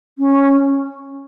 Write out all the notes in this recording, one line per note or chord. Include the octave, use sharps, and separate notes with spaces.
C#4